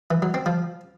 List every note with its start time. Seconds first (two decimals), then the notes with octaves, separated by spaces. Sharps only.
0.11 E3
0.22 F#3
0.34 C4
0.46 F3